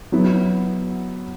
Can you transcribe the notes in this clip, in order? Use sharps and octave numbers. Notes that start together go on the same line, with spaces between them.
F#3 B3 E4